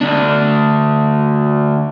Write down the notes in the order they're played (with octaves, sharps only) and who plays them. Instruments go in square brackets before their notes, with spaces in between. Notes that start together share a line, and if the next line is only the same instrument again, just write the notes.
[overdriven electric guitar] D2 D4